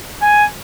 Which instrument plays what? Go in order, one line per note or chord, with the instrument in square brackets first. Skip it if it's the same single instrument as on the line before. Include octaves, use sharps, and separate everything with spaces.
[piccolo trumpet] G#5